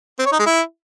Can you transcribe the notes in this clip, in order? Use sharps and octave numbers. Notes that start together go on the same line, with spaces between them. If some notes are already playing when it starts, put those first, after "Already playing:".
C4
C#5
D#4
G#3
E4